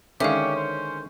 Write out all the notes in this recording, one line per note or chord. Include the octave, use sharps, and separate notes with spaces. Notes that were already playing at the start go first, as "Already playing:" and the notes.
D3 D#3 G#3 C#4 G4 E5 F5
C5